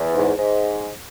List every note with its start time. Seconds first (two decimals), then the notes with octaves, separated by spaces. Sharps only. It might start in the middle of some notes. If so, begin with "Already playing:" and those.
Already playing: E2
0.15 G#2
0.36 G#2